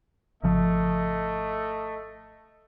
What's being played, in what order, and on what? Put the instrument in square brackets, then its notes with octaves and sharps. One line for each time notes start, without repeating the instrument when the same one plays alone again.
[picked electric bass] G#1 C#3 F3 [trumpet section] A3 D#5